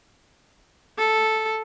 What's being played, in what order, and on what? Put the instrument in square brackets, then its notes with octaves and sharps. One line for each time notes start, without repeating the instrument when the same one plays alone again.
[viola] A4